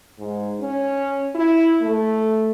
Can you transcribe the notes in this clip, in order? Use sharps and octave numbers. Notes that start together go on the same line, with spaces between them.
G#2
C#4
E4
A3